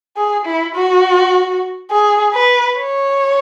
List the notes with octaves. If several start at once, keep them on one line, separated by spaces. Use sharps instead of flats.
G#4
E4
F#4
G#4
B4
C#5